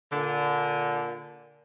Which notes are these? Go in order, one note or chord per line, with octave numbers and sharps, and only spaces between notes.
A#2 D3